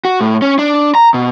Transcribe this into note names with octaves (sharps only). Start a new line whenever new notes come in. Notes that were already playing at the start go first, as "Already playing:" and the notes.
F#4
A2
C#4
D4
A#5
B2